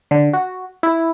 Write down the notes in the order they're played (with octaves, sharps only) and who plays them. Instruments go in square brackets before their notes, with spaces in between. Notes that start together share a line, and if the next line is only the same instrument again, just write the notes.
[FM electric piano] D3
F#4
E4